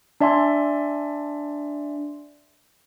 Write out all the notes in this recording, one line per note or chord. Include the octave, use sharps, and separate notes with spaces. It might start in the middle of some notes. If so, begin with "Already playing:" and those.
D4 D5 E5 G#5 C6